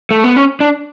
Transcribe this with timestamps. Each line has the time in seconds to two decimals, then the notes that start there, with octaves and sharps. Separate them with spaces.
0.11 A3
0.24 B3
0.36 C#4
0.60 D4